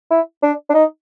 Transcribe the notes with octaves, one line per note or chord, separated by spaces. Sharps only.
E4
D4
D4
D#4